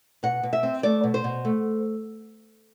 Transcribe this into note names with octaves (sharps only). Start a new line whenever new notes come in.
B2 F#5
B2
E5
C4
A3 D5
B2
C5
B2
A3